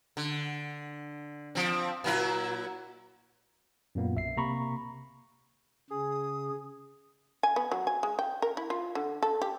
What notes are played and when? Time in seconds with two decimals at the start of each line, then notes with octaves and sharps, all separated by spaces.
0.17 D3
1.55 F3 C4
2.04 A#2 F#3 E4
3.95 F#2 A#2 A#3 B3
4.15 B1 E5 C7
4.37 C3 A#3 A#5 B5 C#6
5.90 C#3 G#4 D#6
7.43 G#5
7.56 B3
7.72 F#3
7.87 G#5
8.03 G#3
8.19 G5
8.42 A#4
8.57 E4
8.70 F4
8.95 D3
9.23 A4
9.42 G4